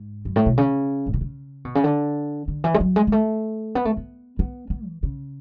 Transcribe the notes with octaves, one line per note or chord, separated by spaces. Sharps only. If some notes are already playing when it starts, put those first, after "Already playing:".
Already playing: G#2
F#2
A2
B2
C#3
A2
B2
C#3
B2
C#3
D3
D3
E3
G#3
F#3
G#3
G#3
A3
B3
A3
B3
B3
B3
E3
C#3